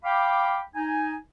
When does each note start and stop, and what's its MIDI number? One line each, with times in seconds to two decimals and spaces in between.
0.04 0.60 77
0.04 0.60 79
0.04 0.60 83
0.04 0.60 86
0.75 1.15 63
0.75 1.15 80